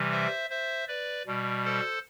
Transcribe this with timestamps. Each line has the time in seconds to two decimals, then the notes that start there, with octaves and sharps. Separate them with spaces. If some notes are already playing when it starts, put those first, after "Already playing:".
Already playing: C3 E3 G3
0.11 C5 E5
0.50 C5 E5
0.88 B4 D5
1.27 B2 G3
1.65 A4 C5